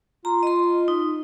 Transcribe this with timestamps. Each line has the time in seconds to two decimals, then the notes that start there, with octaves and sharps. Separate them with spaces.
0.25 F4 A#5
0.43 D#5 C6
0.88 D#4